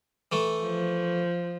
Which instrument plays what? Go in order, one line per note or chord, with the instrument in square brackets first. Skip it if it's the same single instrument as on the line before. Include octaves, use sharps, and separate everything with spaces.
[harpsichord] E3 A3 A4
[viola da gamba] F3